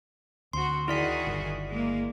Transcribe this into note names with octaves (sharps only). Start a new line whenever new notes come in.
D2 C4 F#4 C6
D#3 E4 F#4 G#4 D5 B6
G1
G#3 A#3